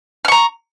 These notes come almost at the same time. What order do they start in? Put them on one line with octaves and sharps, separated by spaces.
F6 C#6 A#5